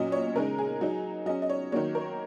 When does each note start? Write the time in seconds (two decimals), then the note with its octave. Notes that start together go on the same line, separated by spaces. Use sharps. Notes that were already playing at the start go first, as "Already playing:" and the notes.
Already playing: A#2 F#3 C#4 D#5
0.12 C#5
0.35 C#3 G#3 D#4 A#4
0.58 G#4
0.81 F#3 D#4
1.26 F#3 C#4 D#5
1.42 D#5
1.49 C#5
1.72 D#3 F#3 A#3 C#5
1.95 A#4